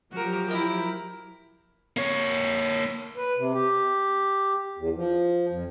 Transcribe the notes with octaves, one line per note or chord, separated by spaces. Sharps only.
F3 F#3 F#4 G4 A#4
E4 A#4
A#3 C#5
B4
C3
G4
E2
F3
F2